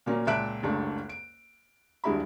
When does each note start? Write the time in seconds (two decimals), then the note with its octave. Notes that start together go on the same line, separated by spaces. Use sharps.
0.06 A#2 F#3 A#3 C#4
0.27 C#2 A#2 E5 A5 F#6 D7
0.63 F#1 C#2 G2 A3
1.09 D7
2.04 D#1 G2 G#3 E4 F#4 B5